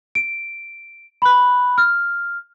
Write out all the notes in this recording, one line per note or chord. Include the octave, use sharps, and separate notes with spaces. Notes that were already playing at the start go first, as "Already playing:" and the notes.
D7
B5 F#6
F6